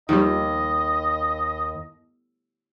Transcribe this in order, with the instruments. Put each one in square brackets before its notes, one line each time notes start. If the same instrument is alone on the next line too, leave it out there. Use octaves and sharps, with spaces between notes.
[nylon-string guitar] D#2 [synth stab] D#3 F3 G3 [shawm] D#5